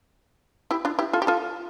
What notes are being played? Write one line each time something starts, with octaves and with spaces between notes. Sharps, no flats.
E4 G4
D4 F4
E4 G4
F4 A4
G4
F4 A4